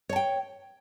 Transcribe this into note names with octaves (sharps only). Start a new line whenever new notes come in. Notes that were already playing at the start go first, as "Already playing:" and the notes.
C#5 G5 A5